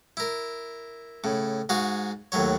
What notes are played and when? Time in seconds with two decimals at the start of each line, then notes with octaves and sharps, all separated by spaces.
0.17 E4 A#4
1.24 A2 C#3
1.69 G#2 F#4 G#4 F5
2.32 D#2 A2 F#3 C#5